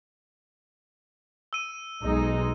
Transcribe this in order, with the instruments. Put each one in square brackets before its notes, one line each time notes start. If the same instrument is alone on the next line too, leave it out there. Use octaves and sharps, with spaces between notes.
[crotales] E6 D#7
[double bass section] B1 [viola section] G#3 D#4